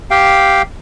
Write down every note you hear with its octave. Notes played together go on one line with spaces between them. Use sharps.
G4 F5 G5